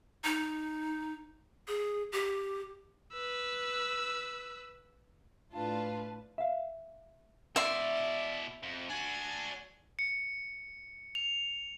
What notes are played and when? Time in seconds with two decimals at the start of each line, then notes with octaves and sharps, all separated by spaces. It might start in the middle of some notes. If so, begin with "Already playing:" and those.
0.24 D#4
1.68 G#4
2.12 G4
3.13 B4 E6
5.53 A2 D4 F4 B4 A5
6.38 E5 F5
7.56 B2 E4 D5 E5 C6
8.63 F2
8.89 D4 F#4 G#5
9.99 C#7
11.15 F7